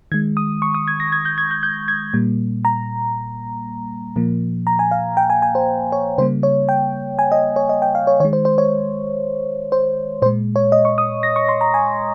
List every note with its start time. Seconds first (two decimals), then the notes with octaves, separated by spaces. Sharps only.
0.12 D#3 G#3 G#6
0.37 D#6
0.62 C#6
0.75 D#6
0.88 G#6
1.00 A#6
1.12 G#6
1.25 G6
1.38 G#6
1.51 G6
1.63 G6
1.88 G#6
2.13 A#2 G3 A#3
2.65 A#5
4.16 A#2 F3 A#3
4.67 A#5
4.79 G#5
4.91 F5
5.17 G5
5.30 G#5
5.42 G#5
5.55 C5
5.92 C#5
6.18 C#3 G3 A#3 C5
6.43 C#5
6.69 G5
7.19 G#5
7.32 D#5
7.56 C#5
7.69 D#5
7.82 G5
7.95 F5
8.07 C#5
8.20 D#3 C#5
8.25 G#3
8.33 C5
8.45 C5
8.58 C#5
9.72 C5
10.22 A#2 C5
10.26 G#3
10.56 C#5
10.72 D#5
10.85 C#6
10.98 D#6
11.23 A#6
11.36 C#6
11.49 C6
11.61 A#5
11.74 G#5